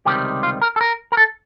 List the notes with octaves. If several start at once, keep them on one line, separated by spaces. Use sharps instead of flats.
C#2 C3 D#3 G3 G4
F4
A#4
A4
A#4
A#4
A4